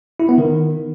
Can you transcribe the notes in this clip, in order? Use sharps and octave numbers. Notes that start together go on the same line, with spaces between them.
E4
B3
D#3